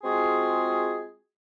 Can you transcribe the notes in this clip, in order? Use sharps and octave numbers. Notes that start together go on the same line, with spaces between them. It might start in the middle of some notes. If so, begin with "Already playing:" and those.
G#3 C4 F4 F#4 G#4